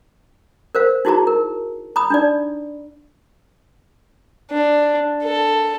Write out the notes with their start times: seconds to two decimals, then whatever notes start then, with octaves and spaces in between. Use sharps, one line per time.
0.75 A#4 C5 F5
1.05 D#4 E4 F#4 G#4 A5 A#5
1.27 A#4
1.96 A#5 B5 D#6
2.10 D4 D#4 D5
4.51 D4
5.24 A4